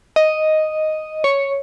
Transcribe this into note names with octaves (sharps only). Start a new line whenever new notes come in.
D#5
C#5